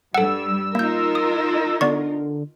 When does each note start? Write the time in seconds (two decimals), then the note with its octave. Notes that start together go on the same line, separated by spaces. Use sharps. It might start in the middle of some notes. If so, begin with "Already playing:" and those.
0.14 G2 G3 A4 F#5 E6
0.75 A#3 D#4 F4 A#4 G6
1.15 D#6
1.81 D3 B3 D5 C#6